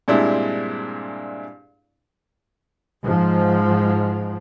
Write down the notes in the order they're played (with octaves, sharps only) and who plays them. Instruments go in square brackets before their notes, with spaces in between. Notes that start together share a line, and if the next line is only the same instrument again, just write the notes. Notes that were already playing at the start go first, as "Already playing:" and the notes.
[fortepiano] G2 A#2 G#3 C4 D4 E4
[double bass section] G#2 F3